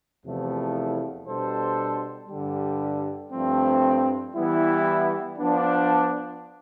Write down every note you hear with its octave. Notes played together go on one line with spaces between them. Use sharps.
E2 C3 F3 A3 E4
B2 G3 D4 A4 C5
G2 D3 G3
G2 F3 A3 C4
E3 G3 B3 E4
F3 B3 D4